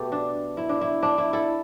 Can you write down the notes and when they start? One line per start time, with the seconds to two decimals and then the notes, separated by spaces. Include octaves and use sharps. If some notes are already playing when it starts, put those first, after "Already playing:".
Already playing: B2 A3 G4 A4
0.12 D4
0.57 E4
0.69 D4
0.81 E4
1.03 D4
1.18 E4
1.33 E4 A4